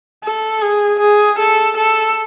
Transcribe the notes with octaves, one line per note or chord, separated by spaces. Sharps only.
A4
G#4
G#4
A4
A4